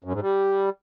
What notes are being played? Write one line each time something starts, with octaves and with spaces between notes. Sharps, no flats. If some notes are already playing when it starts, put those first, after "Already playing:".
F#2
G#2
G3